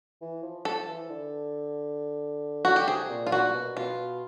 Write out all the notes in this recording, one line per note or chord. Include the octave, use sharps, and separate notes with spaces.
E3
F3
F3 A4
E3
D3
F#4
G4
C3 G#4
A#2
F4
A#2 F#4
B2
B2 F4